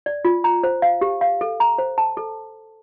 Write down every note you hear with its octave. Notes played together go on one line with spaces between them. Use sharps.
D5
F4
A#5
C5
F5
G4
F5
A4
A#5
C5
A5
A4